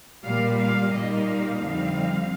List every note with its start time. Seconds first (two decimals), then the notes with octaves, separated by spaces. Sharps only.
0.24 A#2 G3 A#3 F5
0.58 F5
0.92 A#2 G3 A#3 D#4 D#5
1.26 F5
1.59 F2 D3 G3 C4 D#4